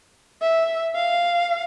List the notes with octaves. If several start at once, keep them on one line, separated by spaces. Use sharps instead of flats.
E5
F5